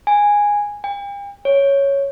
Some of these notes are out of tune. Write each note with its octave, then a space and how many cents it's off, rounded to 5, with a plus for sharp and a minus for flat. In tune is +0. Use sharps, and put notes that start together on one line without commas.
G#5 -10
G5 +45
C#5 +0